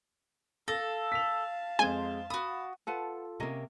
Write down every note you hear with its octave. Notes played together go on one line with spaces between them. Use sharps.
A4 F5 A5 A#6
B6 F7
F2 G#3 C5 G#5
F#4 B5 D#6
F4 A4 B4 F#5 A5
C3 A#3 C#4 D#5 A#5